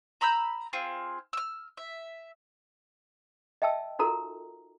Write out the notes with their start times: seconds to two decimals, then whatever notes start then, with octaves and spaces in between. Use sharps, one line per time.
0.21 A#5 B5 E6 G6
0.73 C4 F4 G#4
1.33 E6 F6
1.77 E5
3.62 D#5 E5 G5 A5 E6
3.99 D#4 F4 F#4 A4 A#4 A#5